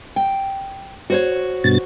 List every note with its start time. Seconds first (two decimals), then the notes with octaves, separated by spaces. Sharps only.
0.16 G5
1.10 F#4 C5 C#5
1.64 G2 B2 A6